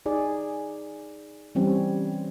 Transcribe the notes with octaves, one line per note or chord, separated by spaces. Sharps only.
D#4 G#4 D5
E3 G3 C4 C#4